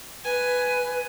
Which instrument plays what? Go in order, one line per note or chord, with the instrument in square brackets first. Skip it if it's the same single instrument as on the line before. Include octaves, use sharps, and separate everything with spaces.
[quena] B4 [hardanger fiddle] G#5